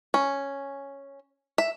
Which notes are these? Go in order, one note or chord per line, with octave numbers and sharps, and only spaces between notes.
C#4
E5